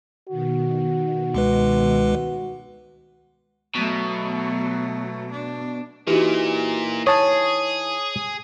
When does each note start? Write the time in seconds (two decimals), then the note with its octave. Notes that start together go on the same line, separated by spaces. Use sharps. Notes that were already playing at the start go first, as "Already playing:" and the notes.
0.29 B2 D#3 F#4
1.34 C#2 G#3 B4
3.75 B2 F#3 A3
5.31 D4
6.07 A#2 E3 D#4 F#4 G4
7.07 G#4 C#5 A5 D#6